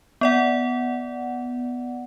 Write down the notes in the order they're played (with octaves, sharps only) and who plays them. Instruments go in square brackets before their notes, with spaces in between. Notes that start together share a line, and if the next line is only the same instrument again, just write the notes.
[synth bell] B3 D5 F#5